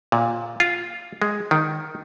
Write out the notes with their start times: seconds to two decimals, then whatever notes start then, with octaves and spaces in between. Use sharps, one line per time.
0.12 A#2
0.60 F4
1.22 G#3
1.51 D#3